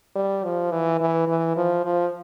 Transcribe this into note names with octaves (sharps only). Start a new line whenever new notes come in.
G3
F3
E3
E3
E3
F3
F3